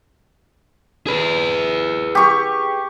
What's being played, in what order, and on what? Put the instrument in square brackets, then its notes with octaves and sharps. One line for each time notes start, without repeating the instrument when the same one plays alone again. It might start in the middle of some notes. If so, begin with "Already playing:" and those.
[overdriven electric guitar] G#4 B4
[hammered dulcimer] G4 C#6